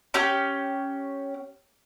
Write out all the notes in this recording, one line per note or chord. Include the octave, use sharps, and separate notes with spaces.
C#4 G4